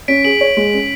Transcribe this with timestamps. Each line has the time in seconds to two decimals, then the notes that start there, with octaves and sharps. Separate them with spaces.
0.08 C#4 B6 D7
0.24 G#4 D7 F#7
0.41 C#5
0.57 G#3
0.73 C#4